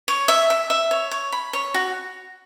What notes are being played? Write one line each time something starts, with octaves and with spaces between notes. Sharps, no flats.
C#5
E5
E5
E5
C#5
C#5
B5
C#5
F#4